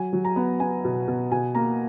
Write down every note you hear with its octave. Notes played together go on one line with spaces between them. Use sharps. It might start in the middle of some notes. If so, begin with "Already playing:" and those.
Already playing: F#3 G#5
F#3
A#5
B3
B3 G#5
B2
B2
B2 G#5
A#3 A#5